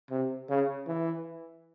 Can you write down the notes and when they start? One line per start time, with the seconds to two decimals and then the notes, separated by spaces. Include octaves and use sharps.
0.11 C3
0.50 C#3
0.87 E3